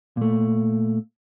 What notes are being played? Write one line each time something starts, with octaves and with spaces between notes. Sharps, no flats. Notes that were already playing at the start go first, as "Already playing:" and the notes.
A#2 A3